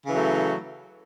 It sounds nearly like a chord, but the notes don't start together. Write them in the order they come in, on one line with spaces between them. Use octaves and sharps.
C#3 E3 F#3 A3